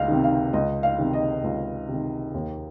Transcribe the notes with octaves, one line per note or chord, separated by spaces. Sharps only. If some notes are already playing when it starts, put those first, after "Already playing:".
Already playing: C#2 D#5 F5
C3 D#3
F5
C#2 D#5
F5
C3 D#3
D#5
C#2
C3 D#3
D#2